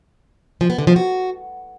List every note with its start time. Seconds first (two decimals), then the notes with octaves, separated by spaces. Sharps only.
0.61 F3
0.70 B3
0.78 D3
0.87 F3
0.96 F#4